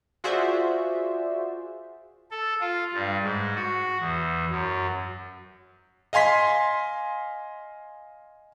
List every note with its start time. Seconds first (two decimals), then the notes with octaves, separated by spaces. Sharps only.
0.24 F4 F#4 G#4 C5 D5 E5
2.31 A4
2.60 F4
2.93 G2
3.23 G#2
3.55 F#4
4.00 E2
4.50 F#2
6.13 D#5 F5 G#5 C6 B6